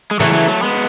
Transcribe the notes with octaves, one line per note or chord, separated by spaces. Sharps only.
G#3
C#3 E3 F#3 A3
F#3 A3
F#3 A3
G#3 B3